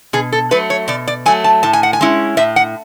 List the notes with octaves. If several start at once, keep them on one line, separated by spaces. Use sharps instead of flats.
B2 G#4
A4
F#3 A3 B4
C#5
B2 D5
D5
F#3 A3 G#5
A5
A2 A5
G#5
F#5
G#5
G#3 C#4 E4
A2 E5
F#5